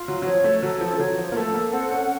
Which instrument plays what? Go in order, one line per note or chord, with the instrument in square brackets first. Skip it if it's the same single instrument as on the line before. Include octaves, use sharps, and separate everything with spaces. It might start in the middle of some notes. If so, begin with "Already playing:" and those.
Already playing: [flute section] F4
[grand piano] F#3
F#3
[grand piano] F3 [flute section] C#5
[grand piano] A3
[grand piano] F#3 [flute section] A4
[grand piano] F3
F3
[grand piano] F#3 [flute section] C#5
[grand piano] F3
A#3
[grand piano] A3 [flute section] A4
[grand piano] A#3
[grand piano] C4 [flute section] F#5
[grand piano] C#4